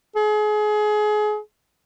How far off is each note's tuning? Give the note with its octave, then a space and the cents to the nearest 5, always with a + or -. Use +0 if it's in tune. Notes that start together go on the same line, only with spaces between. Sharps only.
G#4 +30